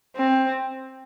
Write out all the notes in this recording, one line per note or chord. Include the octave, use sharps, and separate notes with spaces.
C4